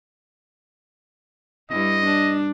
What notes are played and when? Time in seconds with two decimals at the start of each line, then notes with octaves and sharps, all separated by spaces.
1.70 G2 E4 D#5
2.06 D4